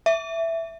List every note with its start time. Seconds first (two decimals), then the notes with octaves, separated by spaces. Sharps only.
0.06 E5